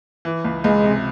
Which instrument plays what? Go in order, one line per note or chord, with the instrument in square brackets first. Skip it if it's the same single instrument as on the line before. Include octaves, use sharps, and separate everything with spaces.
[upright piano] E3
C#2
[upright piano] C#2 [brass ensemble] G#3
[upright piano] C3